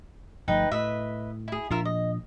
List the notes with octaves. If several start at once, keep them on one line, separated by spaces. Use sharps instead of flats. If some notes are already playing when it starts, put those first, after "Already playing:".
G1 F3 A3 D#4 B4 G5
A2 B4 D#5 E5
E4 G#4
A#2 F3 D4 F4 A#4 E5
D#5